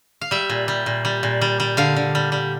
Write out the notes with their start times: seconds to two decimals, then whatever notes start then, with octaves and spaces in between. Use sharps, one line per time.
0.21 F5
0.31 G3 E5
0.49 A#2
0.68 G3
0.86 A#2
1.05 G3
1.23 A#2
1.41 G3
1.60 G3
1.77 D3 F5
1.96 D3
2.15 G3
2.32 G3